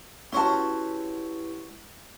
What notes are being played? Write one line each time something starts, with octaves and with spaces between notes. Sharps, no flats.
C#4 E4 F#4 G4 B4 C#5 A5 C6